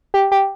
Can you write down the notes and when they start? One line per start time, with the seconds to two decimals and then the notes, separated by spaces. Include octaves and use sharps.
0.14 G4
0.32 G4